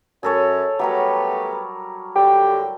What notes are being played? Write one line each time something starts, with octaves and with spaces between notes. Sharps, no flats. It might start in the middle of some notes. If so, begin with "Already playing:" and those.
F#2 G#4 A4 C#5
F#3 G3 A3 B3 G4 A#4
A2 D3 G4 G5